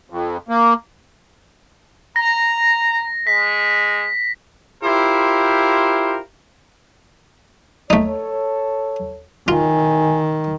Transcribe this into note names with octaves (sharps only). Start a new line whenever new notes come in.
F2
A#3
A#5 A#6
G#3 B6
E4 F4 G4 A#4 C5
A3 D#4 A4 C#5
B1 D#3 E4 F4 G#5